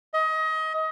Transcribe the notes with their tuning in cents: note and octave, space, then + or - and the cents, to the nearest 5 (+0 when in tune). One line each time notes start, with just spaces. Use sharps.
D#5 +25